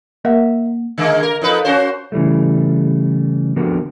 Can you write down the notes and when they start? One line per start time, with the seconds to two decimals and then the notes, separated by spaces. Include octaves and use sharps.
0.25 A#3 A#4 E5 F#5
0.98 D3 G#3 A#3
1.23 A#4
1.42 F2 D#4 B4
1.65 C#4 F#4 C5
2.12 C#3 E3 G3 A3
3.56 D3 F3 B3 C4 F#4 A#4